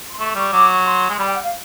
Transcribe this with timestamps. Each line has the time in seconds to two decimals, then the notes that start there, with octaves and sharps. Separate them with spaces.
0.11 C6
0.19 A3 C#6
0.35 G3 C#6
0.52 F#3 D6
0.69 C#6
0.85 C6
1.10 G#3
1.18 G3 B5
1.26 G5
1.35 F#5
1.43 F5